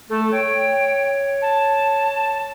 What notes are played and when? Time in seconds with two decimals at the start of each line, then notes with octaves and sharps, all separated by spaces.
0.10 A3 A4
0.32 C#5 G5
1.42 A5